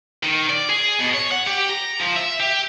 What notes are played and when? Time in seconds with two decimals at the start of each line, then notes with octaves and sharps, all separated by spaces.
0.23 D#3
0.50 D5
0.70 G#4
0.99 B2
1.14 C#5
1.31 F#5
1.47 G4
1.69 A#5
2.01 F3
2.16 E5
2.40 G4